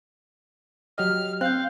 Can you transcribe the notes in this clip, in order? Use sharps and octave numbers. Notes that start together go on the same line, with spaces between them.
F#3 G4 D#5 F6
C4 F5 F#6 G6